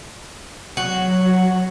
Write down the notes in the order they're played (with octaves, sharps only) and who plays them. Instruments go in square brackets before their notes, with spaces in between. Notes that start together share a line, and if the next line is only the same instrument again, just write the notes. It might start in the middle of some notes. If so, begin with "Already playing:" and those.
[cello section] F#3 [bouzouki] F#4